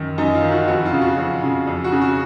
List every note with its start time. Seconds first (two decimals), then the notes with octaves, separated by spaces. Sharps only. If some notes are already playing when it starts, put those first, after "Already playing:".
Already playing: F#2 D#3
0.18 F#2 D#4
0.35 F4
0.43 D#3
0.51 F#4
0.68 F2 F#4
0.85 F4
0.93 C#3
1.01 F#4
1.18 F2
1.43 C#3
1.67 F2
1.84 F#4
1.92 C#3
2.01 F#4